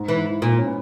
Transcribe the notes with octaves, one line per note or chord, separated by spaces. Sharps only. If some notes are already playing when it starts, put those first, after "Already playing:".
Already playing: G#2
E3
G#2
A#2
C#4
B3